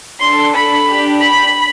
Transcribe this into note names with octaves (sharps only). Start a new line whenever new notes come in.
D4 A4 C6
B5
D4 G4
B5